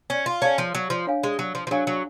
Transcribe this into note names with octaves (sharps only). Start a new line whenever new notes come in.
C#4
F4
C#4 G#4 C#5 F5 A5
F3
F#3
F3
D4 G#4 C#5 F5 G#5
G#3
F#3
F3
F3
F#3 D4 G#4 C#5 F5 G#5
F#3